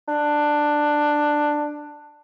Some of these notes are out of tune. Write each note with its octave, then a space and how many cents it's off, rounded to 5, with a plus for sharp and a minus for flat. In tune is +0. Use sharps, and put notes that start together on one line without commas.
D4 +10